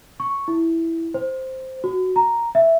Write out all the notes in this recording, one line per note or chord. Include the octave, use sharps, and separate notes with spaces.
C#6
E4
C5
F#4
A#5
E5